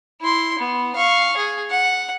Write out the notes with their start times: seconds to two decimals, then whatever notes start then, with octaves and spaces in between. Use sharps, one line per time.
0.21 E4 C6
0.58 B3
0.96 F5 C#6
1.36 G#4
1.70 F#5